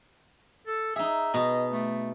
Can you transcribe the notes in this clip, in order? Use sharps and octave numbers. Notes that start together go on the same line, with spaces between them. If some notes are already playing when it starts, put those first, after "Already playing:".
A4
D#4 G#4 E5
B2 D#5
A3